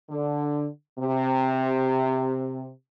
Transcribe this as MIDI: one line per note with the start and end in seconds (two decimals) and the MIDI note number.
0.10 0.67 50
0.99 2.69 48